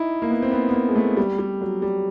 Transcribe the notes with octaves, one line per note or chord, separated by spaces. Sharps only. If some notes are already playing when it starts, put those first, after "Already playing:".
Already playing: D#4 E4
A#3
B3
C4
B3
B3
A#3
G#3
A3
G3
G3
F#3
G3